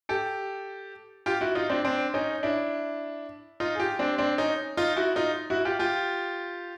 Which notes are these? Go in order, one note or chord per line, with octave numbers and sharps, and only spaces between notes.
G4 A4
F4 G4
E4 F#4
D#4 F4
C4 D4
C4 D4
C#4 D#4
D4 E4
D#4 F4
G#4
F4 G4
C4 D4
C4 D4
C#4 D#4
D#4 F4
E4 F#4
D#4 F4
E4 F#4
F4 G4
F4 G4